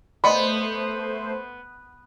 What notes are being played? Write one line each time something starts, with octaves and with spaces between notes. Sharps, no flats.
A3 B3 C5 D5 D#5 B5 C6